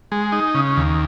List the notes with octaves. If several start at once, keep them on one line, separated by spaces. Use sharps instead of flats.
G#3
D#4
C#3
D#2